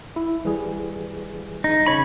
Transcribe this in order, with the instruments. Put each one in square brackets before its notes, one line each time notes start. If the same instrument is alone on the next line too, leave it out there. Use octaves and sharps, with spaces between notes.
[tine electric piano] E4
E3 G3 G#4
[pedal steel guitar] D#4
C#3 C#5 B5